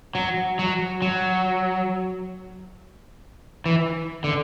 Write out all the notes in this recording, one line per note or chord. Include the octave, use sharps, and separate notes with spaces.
F#3
F#3
F#3
E3
D3